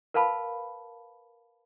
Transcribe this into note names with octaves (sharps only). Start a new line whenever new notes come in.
A#4 B4 F5 A5 B5